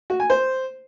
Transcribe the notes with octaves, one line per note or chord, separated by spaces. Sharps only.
F#4
G#5
C5